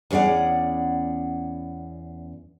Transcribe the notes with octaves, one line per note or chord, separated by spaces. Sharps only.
E2 C#4 G#4 D5 F#5